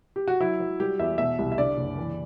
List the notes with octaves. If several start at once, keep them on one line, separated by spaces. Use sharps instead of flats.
G4
F#4
F#3 E4
F#3
G3 G4
E2 E5
B2 E5
C2
E5
D3 D5
F#1
E3